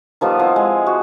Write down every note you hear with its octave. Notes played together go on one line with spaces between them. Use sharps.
D#3 F3 G3 B3
F3 C4 E4
G#3
F#4